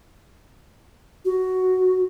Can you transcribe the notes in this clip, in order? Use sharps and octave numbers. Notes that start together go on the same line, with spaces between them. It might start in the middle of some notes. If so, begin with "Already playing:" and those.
F#4